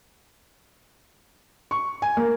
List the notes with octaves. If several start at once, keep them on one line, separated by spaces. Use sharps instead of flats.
C#6
G#5
A#3